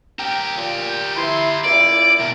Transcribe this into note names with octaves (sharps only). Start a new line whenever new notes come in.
G4 A#4 G5
A#2
G6
E4 C6
C#2 A#2 E4 D5 D7
B2 A#4